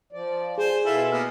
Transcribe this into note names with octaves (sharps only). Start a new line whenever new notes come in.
F3 D5
G#4 C5 G#5
B2 E4 F4 A4 E5 G#5
A#3 B3 F6